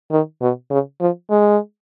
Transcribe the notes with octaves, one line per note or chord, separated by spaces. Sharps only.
D#3
B2
C#3
F3
G#3